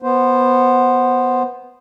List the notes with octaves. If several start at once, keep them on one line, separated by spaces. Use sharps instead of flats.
B3 C5